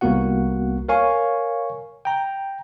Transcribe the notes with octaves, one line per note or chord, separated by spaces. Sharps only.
C2 A#3 B3 F#4 F#5
A#4 C#5 F5 G#5 C#6
G5 A#5